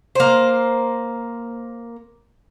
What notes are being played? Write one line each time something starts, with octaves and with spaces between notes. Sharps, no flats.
A#3 C5